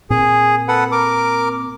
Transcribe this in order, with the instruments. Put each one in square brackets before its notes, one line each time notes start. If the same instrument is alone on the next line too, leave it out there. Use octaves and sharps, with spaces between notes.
[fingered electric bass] A#2 C4 [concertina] G#4
[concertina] A4 B4 F#5
A#4 D6